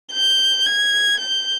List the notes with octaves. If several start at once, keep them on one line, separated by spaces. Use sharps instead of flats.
G6
G#6
G6